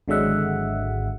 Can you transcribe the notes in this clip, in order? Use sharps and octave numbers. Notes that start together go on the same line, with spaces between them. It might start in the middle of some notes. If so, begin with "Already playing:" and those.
G#1 D3 F#3 G#3 E5 F#5